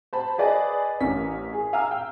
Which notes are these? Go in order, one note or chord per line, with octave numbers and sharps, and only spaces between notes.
C5 A5 B5
G#4 B4 D5 D#5
A1 C#4 A#4 B6
G#4
F5 G#5 A#5 E6 F6
G5